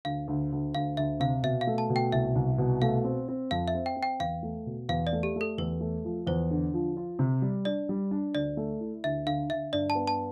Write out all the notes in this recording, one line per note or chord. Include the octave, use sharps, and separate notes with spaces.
D2 F5
D2
D2
D2 F5
D2 E5
C3 F5
B2 E5
F5
A3
A5
B2
G5
C2 E5
C2
B2
A3 F5
C4
C4
F2 F5
E5
C4
G5
C4
G5
E2 F5
A3
B2
E2 F5
D5
A3
G4
A3
A4
E2 B4
A3
F3
E2 C5
D3
F3
F4
C3
G3
D4 D5
G3
D4
D2 D5
A3
E4
D2 E5
D3 F5
D3 E5
G2 D5
A5
B3
A5